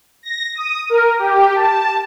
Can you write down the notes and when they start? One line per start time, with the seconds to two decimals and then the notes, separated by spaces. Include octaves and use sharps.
0.23 A#6
0.55 D#6
0.90 A#4
1.19 G4
1.55 A5